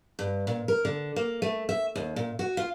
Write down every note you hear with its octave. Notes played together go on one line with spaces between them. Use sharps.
G2
A#2
A#4
D3
A#3
A3
E5
D#2
A#2
F#4
F4